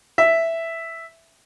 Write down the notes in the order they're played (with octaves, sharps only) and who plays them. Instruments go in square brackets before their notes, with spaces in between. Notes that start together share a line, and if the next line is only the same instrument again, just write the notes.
[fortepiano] E5